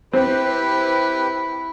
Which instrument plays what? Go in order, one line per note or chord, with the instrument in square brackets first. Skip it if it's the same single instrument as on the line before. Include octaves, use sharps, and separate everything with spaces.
[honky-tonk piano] C4 [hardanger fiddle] E4 [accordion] G4 B4